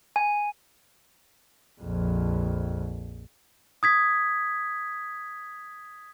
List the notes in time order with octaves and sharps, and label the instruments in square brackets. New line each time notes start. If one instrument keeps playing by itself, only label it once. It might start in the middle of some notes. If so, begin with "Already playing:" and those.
[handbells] G#5
[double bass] A#1 F2
[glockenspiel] D#6 G#6 B6